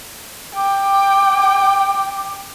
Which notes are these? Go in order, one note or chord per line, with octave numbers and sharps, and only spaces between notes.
G5 D6